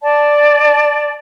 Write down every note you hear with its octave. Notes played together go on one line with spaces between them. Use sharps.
D5 A5